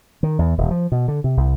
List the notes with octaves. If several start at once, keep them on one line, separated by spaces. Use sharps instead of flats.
D#3
E2
D#1
F3
B2
D3
C3
C2